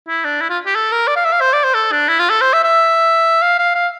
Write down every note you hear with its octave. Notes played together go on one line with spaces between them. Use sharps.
E4
D4
E4
F4
G4
A4
A#4
D5
F5
E5
F5
C5
D5
C5
A4
D4
E4
F4
A4
C5
E5
E5
F5
F5
F5